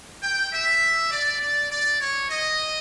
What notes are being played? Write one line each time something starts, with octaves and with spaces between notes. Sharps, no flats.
G5
E5
D5
D5
D5
C#5
D#5